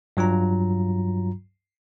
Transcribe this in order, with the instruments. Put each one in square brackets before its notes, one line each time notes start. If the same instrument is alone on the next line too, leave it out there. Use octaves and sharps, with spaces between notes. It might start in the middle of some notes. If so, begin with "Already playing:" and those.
[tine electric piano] G2 F#3 F4 A#5